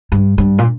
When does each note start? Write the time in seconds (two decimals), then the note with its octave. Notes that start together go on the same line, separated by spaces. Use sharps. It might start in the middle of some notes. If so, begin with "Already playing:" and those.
0.12 G2
0.38 G2
0.58 A#2